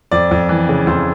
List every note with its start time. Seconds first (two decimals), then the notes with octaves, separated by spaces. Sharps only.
0.11 F2 D5
0.31 F2
0.49 E3
0.69 C#3
0.87 F2 C5